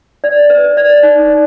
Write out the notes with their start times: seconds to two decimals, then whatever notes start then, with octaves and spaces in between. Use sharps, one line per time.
0.24 D5
0.50 B4
0.77 D5
1.03 D#4
1.29 D5